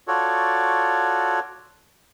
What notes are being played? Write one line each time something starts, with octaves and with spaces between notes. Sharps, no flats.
F4 F#4 A4 C#5 D5